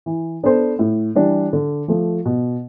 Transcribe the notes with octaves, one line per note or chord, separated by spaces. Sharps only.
E3
B3 D4 A4 C5
A2
E3 G3 D4
D3
F3 A3
B2